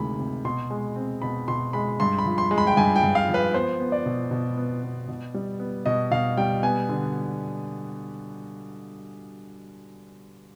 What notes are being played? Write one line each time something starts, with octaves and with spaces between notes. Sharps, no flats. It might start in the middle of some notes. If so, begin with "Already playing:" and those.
Already playing: D2 C3 D#3 G#3 B5
C3
B2 C6
G#3
C4
B2 B5
B2 C6
G#3 B5
G2 C6
B5
F3
C6
G#3
B5
G5
G2 G#5
G5
G2
F5
F3
B4
B3 C5
B3
D5
B2
B2
B3
B3
B2
G3
B3
B2 D#5
B2 F5
G3 G5
B3 G#5
D3